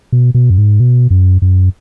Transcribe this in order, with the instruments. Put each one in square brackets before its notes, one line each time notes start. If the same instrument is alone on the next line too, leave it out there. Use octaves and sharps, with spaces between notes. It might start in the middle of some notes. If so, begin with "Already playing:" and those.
[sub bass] B2
B2
F#2
G#2
B2
F#2
F#2